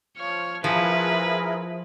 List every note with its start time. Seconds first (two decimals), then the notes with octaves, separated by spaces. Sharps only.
0.18 F3 C#5 F6
0.64 F3 E4 G#4 A#4 B4